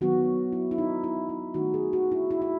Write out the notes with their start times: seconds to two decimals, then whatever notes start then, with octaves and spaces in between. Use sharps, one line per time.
0.01 D#3 F#3 B3 F#4
0.52 E4
0.71 E4
0.78 D#4
1.04 E4
1.29 E4
1.54 D#3 A3 D#4 F#4
1.74 G#4
1.93 F#4
2.12 E4
2.31 E4
2.42 E4